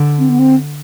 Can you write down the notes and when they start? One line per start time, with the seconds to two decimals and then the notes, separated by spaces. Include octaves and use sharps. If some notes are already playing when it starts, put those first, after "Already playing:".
Already playing: D3
0.19 C4
0.29 B3
0.39 C4